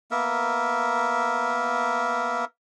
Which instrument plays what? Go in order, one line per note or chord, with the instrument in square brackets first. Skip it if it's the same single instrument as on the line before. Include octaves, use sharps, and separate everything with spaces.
[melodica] A#3 B3 A#4 E5